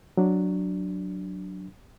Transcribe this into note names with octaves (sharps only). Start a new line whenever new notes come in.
F#3 D4